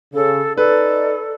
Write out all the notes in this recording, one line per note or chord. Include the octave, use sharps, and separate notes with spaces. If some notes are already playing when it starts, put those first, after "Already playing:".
C#3 A4
D#4 A4 B4 D5